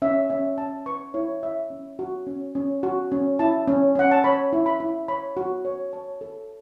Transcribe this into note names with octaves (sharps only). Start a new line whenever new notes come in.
C#4 E5
C#4 E5
C#4 A5
B4 C#6
E4 C#5
E4 E5
C#4
F#4
C#4
C#4
F#4
C#4
E4 A5
C#4
C#4 F#5
A5
C#5 B5
E4
B5
E4
C#5 B5
F#4
C#5
C#5 A5
A4